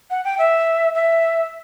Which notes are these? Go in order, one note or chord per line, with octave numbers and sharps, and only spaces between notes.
F#5
G5
E5
E5